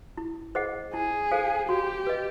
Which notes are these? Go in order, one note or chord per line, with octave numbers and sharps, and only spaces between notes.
E4
G#4 C5 D#5 F#5
E4 G#4
A4 C5 F5 G#5
F#4 G4
B4 D#5